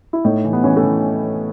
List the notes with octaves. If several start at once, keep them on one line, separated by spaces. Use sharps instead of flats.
E4
A2 D#4
E3
B3
E3 C#4
A3
E3